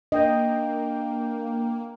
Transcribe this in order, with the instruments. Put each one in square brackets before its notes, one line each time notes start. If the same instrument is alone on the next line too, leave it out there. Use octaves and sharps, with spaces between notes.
[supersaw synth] A#3 [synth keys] D4 G5 G6 [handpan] D#5